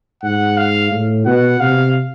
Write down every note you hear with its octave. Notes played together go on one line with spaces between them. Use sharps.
G#2 F#5
F5
A2
B2 F#5
C3 F5